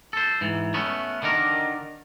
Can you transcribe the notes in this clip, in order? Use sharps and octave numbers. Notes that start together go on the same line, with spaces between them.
A4 C5
G#2 E3
A3 B3 C#4
D3 D#3 D4 A#4